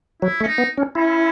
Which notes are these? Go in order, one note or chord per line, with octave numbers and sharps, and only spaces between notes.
F#3 E4
A3 C#4
D#4
B3
C#4
C#4 E4